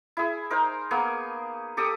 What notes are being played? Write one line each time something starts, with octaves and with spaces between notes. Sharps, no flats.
E4 G#4
D#4 A#4 C5
A#3 B3 G#4
G4 A4 D6 D#6